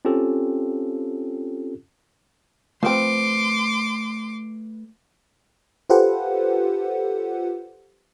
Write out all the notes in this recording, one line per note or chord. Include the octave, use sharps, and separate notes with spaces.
C4 C#4 F4 G4 A4
F3 A3 C4 B4 C6 D6
F4 G4 A4 B4 C5 F#5